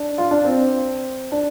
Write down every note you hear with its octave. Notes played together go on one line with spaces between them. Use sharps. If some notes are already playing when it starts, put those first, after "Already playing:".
Already playing: D4
F4
D4
C4
D4